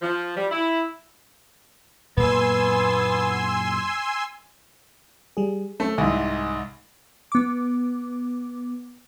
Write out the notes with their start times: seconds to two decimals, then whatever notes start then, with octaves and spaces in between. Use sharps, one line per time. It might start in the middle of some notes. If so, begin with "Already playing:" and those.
0.02 F3
0.37 G3
0.51 E4
2.17 F#2 A#2 A#3 B3 G#5 C6 E6
5.37 G3 G#4
5.80 A3 C4 C#4 A4
5.98 C2 G#2 G#5
7.32 B3 D6